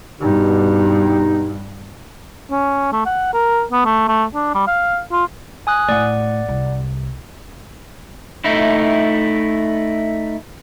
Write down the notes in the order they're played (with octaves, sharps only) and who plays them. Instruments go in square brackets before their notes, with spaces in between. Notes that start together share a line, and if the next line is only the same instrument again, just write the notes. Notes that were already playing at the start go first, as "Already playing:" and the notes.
[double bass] G2 [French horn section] B2 G4 [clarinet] D#4
[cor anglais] C#4
A3
F#5
A#4
B3
A3
A3
D4
G3
F5
F4
[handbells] G#5 D#6 F#6
[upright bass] A2 [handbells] D5 F#5
[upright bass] C2
[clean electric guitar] A3 D#4 E4